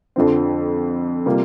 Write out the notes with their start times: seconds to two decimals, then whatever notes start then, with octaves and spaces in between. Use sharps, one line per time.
0.16 F2 D3 F3 C4
1.26 C3 G3 A#3 F4